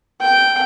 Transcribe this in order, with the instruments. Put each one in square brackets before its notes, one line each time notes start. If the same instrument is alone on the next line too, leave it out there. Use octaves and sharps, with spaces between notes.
[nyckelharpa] G5